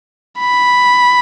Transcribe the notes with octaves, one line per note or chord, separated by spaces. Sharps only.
B5